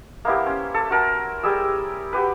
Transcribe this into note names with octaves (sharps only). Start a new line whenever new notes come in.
A#3 B3 E4 G4
C#4 C5
A4
F#4 A#4 A5
G3 G4 G#4 E6
F#4 G4 B4